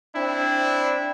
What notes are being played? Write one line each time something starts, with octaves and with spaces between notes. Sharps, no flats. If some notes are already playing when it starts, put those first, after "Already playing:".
C4 D4 E4